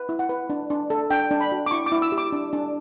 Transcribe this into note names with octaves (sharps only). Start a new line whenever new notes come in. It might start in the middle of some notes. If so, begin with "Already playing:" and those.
Already playing: B4
E4
F#5
B4
D4
D4
A4
D4 G5
D4
B5
F#4
D6
E4 C#6
D6
E4
E6
G4
D6
D4
D4